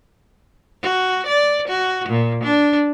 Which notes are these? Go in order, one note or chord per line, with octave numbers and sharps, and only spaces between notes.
F#4
D5
F#4
A#2
D4